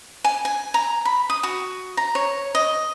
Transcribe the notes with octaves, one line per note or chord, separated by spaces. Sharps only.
G#5
G#5
A#5
B5
D#6
F#4
A#5
C#5
D#5